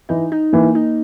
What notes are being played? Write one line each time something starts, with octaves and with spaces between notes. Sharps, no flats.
E3 D#4
D#4
E3 A#3
D#4